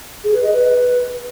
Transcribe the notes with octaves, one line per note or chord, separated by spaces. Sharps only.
G#4
B4
D#5
B4